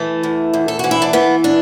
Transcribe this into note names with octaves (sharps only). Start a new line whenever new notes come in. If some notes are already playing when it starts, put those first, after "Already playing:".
Already playing: E3 A3
E2
E2
A4
E3 F#4
E4
D4
E3 B3
D4